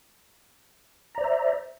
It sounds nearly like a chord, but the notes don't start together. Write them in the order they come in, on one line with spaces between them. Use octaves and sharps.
A#5 D5 C5 E5